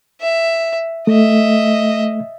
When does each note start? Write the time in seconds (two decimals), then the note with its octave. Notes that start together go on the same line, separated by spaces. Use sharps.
0.21 E5
1.07 A3 D#5 E5